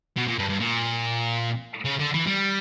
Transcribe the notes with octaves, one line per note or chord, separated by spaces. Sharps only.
B2
A#2
G2
G2
A#2
C#3
D3
E3
G3